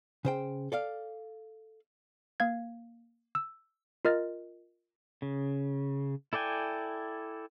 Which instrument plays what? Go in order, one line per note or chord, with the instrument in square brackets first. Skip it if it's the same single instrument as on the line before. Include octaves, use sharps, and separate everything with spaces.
[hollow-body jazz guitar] C#3 C5 G5
A4 D5 F5
[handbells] A#3 F5 G#6
E6
F4 A#4 D#5 F6 A6
[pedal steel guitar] C#3
E4 A4 D5 G5 G#5